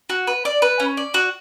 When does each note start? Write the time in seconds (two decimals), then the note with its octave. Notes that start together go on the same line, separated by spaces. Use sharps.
0.10 F#4
0.27 B4
0.45 D5
0.62 B4
0.80 C#4
0.97 D5
1.14 F#4